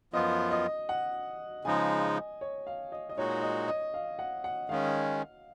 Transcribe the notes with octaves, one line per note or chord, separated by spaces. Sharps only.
F#2 F3 B3 F4 D#5
D#5
F#5
C#3 F3 G#3 D#4 G#5
D#5
C#5
F5
D#5
D#5
A#2 G#3 D#4 F#4 C#5
D#5
D#5
F5
F#5
F#5
D#3 G#3 C#4 F5